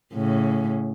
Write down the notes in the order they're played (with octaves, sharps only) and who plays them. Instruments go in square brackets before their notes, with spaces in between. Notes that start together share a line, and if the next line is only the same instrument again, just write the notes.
[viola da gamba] A2 C#3